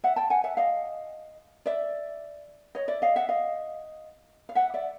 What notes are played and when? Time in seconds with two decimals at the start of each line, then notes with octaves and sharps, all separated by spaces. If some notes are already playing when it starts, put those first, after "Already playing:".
0.04 E5 F#5
0.16 G5 A5
0.30 F#5 G#5
0.44 E5 F#5
0.57 D#5 F5
1.66 D5 E5
2.75 C#5 D#5
2.88 D5 E5
3.02 D#5 F5
3.16 E5 F#5
3.29 D#5 F5
4.49 F5
4.55 E5 F#5
4.74 D5 E5